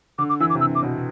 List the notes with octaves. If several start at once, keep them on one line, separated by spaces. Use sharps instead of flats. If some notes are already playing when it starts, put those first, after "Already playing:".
D3 D6
D6
E3 E6
D6
C3
D3 E6
D6
B2